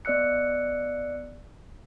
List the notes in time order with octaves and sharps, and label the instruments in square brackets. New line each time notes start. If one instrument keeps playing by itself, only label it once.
[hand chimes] B3 D5 D#5 E6 F#6 C#7